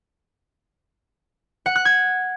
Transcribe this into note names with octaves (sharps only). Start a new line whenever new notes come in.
F#5
F#6
G#6